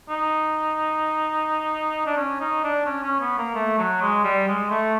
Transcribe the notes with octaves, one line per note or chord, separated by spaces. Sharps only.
D#4
D4
C#4
D#4
D4
C#4
C#4
B3
A#3
A3
F#3
G#3
G3
G#3
A3